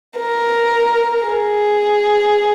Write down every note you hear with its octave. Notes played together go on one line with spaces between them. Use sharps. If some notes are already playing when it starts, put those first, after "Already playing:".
A#4
G#4